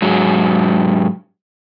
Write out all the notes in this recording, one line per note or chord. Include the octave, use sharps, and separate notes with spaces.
G#2 F#3